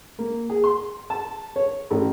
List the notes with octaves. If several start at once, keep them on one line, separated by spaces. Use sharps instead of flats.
A#3
G#4
C6
A5
C#5
A1